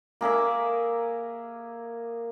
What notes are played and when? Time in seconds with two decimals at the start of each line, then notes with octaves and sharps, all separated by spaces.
0.21 A#3 G#4 A#4 E5